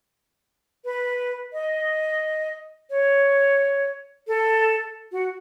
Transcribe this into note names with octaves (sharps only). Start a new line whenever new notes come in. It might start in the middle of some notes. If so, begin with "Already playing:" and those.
B4
D#5
C#5
A4
F#4